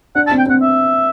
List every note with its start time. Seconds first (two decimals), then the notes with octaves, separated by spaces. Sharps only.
0.15 D4 F#5
0.27 A5
0.31 C4
0.38 G5
0.46 C4 F#5
0.62 E5